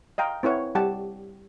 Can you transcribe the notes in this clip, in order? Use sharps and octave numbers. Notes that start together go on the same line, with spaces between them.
D#5 F5 G5 A#5
C4 E4 B4 C#5 F#5
G3 G4 F#5 G5 A5